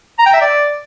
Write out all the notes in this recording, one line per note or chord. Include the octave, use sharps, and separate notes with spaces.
A#5
G5
E5
D5